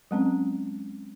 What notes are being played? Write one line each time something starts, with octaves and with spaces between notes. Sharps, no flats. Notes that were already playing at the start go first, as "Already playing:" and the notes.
F#3 G#3 C4 C#4